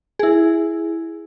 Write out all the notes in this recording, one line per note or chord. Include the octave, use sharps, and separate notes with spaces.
E4 G#4